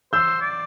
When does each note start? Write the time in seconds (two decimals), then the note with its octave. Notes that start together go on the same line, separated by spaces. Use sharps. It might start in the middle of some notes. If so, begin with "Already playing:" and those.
0.13 C5 E6 G6
0.41 D5